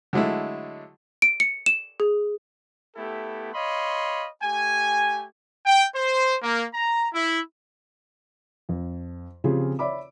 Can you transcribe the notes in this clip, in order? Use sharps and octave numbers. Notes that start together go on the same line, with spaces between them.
D3 F#3 G#3 A3 E4
D7
C#7
E7
G#4
A3 B3 E4 G4 A4
C#5 D#5 F5 B5 C6
A3 G4 G#5
G5
C5
A#3
A#5
E4
F2
C#3 F3 C4 F4 G4 G#4
C#5 D5 E5 B5 D6